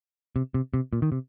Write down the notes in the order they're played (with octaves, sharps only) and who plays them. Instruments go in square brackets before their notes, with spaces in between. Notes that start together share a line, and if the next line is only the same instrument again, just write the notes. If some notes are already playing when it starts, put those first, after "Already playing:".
[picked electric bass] C3
C3
C3
A#2
D#3
C3